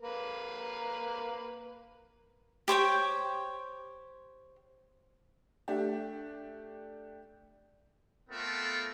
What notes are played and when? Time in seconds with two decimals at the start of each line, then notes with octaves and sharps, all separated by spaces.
0.01 A#3 A#4 B4
2.68 G4 C5 C#5 G5
5.68 A3 D4 G4
8.30 A3 B3 C4 F4 A4 A#4